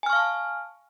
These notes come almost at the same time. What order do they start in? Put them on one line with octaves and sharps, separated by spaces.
G#5 F6 C#6 F5 A5